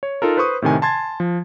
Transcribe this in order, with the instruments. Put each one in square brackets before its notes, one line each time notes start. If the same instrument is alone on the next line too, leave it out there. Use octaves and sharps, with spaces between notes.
[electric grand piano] C#5
D#4 F4 A4 A#4
B4 C5 C6 C#6 D#6
A2 C3 D#3 G#5
G#5 A5 C6 G#6 A6
F3